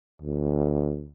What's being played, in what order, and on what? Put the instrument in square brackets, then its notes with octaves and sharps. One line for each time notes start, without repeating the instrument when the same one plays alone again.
[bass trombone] D2